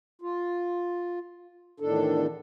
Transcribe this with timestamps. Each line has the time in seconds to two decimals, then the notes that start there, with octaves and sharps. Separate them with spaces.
0.22 F4
1.80 E2 A2 D#3 D4 A4